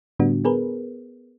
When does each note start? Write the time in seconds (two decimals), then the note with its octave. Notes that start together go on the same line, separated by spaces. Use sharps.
0.19 A2 D3 G3 B3 D4 F#4
0.45 B3 G#4 A#4 B4